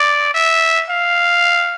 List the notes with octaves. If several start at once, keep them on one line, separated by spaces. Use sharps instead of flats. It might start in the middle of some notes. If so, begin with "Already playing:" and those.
Already playing: D5
E5
F5